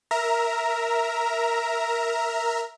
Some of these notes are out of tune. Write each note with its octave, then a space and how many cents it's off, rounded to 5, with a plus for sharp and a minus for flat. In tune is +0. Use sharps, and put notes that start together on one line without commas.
A#4 +0 E5 +0 A#5 +0